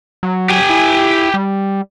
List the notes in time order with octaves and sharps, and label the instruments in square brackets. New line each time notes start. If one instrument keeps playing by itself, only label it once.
[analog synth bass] F#3
[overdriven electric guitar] G4 G#5
[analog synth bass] E4
G3